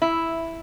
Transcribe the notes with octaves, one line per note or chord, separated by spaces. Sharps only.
E4